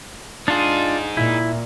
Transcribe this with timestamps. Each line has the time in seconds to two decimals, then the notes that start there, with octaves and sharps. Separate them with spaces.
0.48 D4 D#4 F4 G#4
1.17 A#2 E4